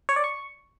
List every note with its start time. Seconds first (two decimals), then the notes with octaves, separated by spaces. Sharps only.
0.09 C#5
0.16 D5
0.24 C#6